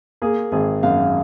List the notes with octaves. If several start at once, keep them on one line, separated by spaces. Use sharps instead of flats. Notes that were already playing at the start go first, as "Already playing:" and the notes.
A#3 G#4
G#1 G#4
F#2 F5